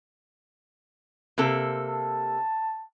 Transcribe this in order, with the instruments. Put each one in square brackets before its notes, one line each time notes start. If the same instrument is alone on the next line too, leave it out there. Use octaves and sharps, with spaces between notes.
[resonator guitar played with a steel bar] C3 A#3 A4
[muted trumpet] A5